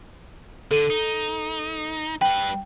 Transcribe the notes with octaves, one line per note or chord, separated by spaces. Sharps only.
D3 A4 D#7
D#4
G3 B4 G5